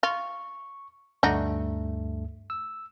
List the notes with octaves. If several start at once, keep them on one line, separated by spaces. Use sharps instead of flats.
F4 C#6
D2 G2 A3 D4 D#4 F#4
E6